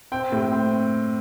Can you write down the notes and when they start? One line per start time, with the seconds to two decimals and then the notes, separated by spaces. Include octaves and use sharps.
0.12 C4 G5
0.32 A2
0.52 C4